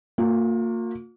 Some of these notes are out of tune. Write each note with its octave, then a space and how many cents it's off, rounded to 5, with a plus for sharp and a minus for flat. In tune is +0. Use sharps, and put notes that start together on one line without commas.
A#3 -30 F4 +40